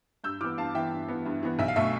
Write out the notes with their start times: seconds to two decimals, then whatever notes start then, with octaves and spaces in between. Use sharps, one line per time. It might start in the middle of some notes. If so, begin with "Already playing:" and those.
0.24 G2 E6 G6
0.41 E3 B3 D6 F6
0.58 G2 F5 A5
0.75 E3 B3 E5 G5
0.91 G2
1.08 E3 B3
1.26 G2
1.43 E3 B3
1.59 B1 E5
1.68 F5
1.76 B2 A3 E5